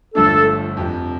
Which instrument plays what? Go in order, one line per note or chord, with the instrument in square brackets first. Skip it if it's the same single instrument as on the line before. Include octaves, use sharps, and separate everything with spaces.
[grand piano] G1 G2 F3 A3 D4 [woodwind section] A4
[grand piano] F2 C3 F3